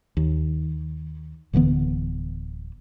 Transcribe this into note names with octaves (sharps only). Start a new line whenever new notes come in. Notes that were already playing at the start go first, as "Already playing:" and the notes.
D#2
D1 D3 E3 B3